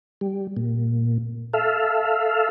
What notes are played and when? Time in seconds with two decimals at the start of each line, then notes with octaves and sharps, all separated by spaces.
0.21 G3
0.57 A#2
1.54 A4 E5 F5